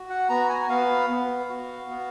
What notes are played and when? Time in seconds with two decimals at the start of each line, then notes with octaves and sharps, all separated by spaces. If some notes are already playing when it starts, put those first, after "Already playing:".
Already playing: F#4
0.10 F#5
0.29 B3 A#5
0.49 G#5
0.70 B3 F5
1.10 B3
1.50 F#4
1.91 B3